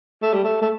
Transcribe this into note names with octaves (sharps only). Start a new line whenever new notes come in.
A3
G3
A3
A3